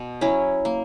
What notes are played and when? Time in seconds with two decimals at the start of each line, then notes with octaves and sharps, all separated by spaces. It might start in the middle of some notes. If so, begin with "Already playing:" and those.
Already playing: B2
0.21 F#3 C#4 E4
0.65 A#3